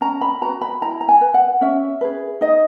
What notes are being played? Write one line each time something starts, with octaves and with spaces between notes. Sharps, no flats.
C#4 A#5
B5
F#4 B4 A#5
B5
E4 A#5
A#5
G#5
B4
F#5
C#4 E5
G#4 B4
D#4 D#5